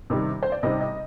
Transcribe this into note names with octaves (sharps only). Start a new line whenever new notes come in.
C3 D#3 G3
C5
D5
C3 G3 C4 D#4 D#5
D#5